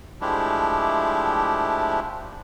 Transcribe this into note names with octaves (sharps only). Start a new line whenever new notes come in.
F3 G#3 A3 D4 E4 G4